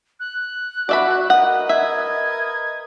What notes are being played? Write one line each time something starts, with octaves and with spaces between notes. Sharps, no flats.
F#6
F#4 D5 E5 B5
A#4 B4 D#5 F#5
E5 G#6